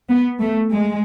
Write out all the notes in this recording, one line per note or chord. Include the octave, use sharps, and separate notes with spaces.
B3
A3
G#3